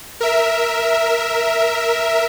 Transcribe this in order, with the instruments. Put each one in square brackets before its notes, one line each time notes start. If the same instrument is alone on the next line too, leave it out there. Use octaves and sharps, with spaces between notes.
[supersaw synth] A#4 E5